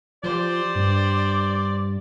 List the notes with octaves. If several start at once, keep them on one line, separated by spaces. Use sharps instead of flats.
F3 G4 C5 D5
G2